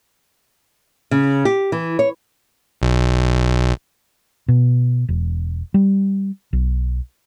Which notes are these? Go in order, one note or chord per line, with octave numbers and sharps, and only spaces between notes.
C#3
G4
E3
C#5
B1
B2
E1
G3
B1